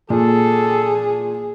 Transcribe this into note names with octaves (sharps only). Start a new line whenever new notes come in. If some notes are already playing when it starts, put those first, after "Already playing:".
A#2 G#4 A4